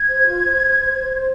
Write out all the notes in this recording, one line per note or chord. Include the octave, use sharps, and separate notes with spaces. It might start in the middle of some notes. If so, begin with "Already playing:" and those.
Already playing: G#6
C5
F4
C5
C5
C5
C5
C5